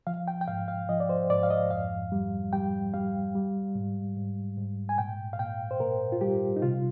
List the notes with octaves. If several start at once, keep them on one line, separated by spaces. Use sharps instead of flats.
F3 F5
G5
G5
G#2 F5
F5
F3 D#5
D5
C5
G#2 D5
F5
D#5
F2 F5
G3
G3 G5
G3 F5
G3
G#2
G#2
G#2
G#5
A#2 G5
F5
A#2 G5
C5
A#2 A#4
F4
G3 G4
D#4
C3 F4